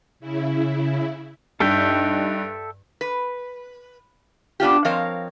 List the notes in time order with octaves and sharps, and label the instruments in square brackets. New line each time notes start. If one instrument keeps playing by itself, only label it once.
[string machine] C#3 E4
[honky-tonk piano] G2 [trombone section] D4 D#4 [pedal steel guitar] A4 E5 G5
[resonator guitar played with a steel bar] B4
B3 D4 F4 G4
F3 C4 A#4 C#5 D#5 F5